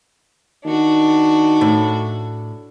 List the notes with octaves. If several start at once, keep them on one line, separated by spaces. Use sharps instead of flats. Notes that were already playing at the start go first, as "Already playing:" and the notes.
D#3 D4 F#4
A2